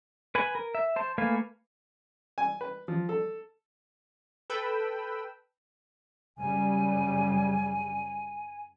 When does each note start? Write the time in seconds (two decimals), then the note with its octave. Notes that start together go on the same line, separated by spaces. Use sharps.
0.35 B4 G#5 B5
0.55 A#4
0.75 E5
0.96 C5 A5
1.18 A3 A#3 B4 F5 G#5
2.38 G#5
2.61 B4
2.88 F3
3.09 A4
4.50 A4 B4 G5 B5 E6
6.38 F#2 C#3 G3 G#5